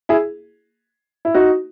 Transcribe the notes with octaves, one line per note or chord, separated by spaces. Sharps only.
E4 G#4
E4
D#4 F#4